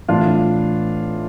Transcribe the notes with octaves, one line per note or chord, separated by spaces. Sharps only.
A2 E3 D4 F4